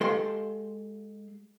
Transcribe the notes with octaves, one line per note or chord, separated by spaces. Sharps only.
G#3 G4 A4 F5 C6